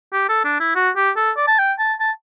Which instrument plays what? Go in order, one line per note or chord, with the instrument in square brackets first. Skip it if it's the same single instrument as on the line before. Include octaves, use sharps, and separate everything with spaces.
[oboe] G4
A4
D4
E4
F#4
G4
A4
D5
A5
G5
A5
A5